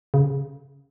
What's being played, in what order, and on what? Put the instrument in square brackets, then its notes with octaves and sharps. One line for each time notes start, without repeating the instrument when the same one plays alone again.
[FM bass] C#3